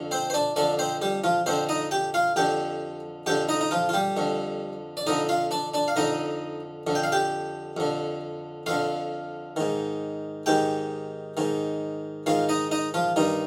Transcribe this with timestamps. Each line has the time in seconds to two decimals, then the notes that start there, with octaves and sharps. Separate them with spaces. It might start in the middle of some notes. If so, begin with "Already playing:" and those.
Already playing: F2 D3
0.11 C4 C5
0.30 C5
0.34 D4 D5
0.56 F2 D3 D4 D5
0.79 C4 C5
1.02 G3 G4
1.24 F3 F4
1.46 F2 D3 C4 C5
1.69 D#4 D#5
1.91 G4 G5
2.14 F4 F5
2.36 F2 D3 G4 G5
3.26 F2 D3 G4 G5
3.49 D#4 D#5
3.61 D#4
3.71 F3 F4
3.89 F4
3.93 G3 G4
4.17 F2 D3
4.97 D5
5.07 F2 D3 D#4 D#5
5.29 F4 F5
5.51 D4 D5
5.74 D4 D5
5.88 F5
5.96 F2 D3 D#4 D#5
6.87 F2 D3
6.95 G5
7.03 F5
7.12 G4 G5
7.77 F2 D3
8.66 F2 D3 F4 F5
9.56 G#2 D#3
10.46 G#2 D#3 G4 G5
11.37 G#2 D#3
12.26 G#2 D#3 F4 F5
12.49 D#4 D#5
12.71 D#4 D#5
12.94 F3 F4
13.16 G2 D#3 D#4